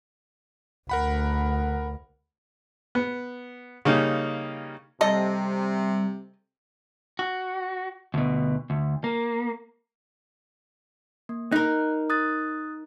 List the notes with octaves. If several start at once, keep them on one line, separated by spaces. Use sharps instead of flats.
D2 A#4 F#5 B5
B3
C#3 G3 A#3 C#4 D#4
C3 G3 A4 D#5
F#4
D2 B2
D2
A#3
A#3
D#4 A#4 F#6
D#6 F#6 A6